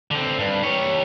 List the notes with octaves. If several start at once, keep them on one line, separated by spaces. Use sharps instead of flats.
D3 C4
G2
G4 C#5